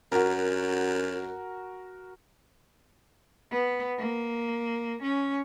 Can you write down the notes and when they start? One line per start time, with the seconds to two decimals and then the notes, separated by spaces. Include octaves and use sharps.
0.12 F#2 F#4 A#4
3.51 B3
3.98 A#3
5.02 C#4